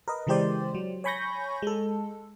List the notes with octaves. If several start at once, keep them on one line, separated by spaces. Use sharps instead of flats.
A#4 B4 D#5
C#3 E3 G#3 G4 C5 D5
F#3
C#5 G#5 B5 C#6 G6 A#6
G#3 A4